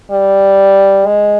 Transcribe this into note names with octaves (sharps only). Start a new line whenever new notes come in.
G3
G#3